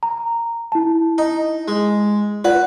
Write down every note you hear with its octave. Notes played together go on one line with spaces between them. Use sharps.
A#5
E4 A5
D#4
G#3
F4 B4 D5 F#5